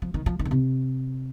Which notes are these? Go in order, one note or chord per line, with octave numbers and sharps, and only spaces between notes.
F3
D#3
F3
D#3
C#3
C3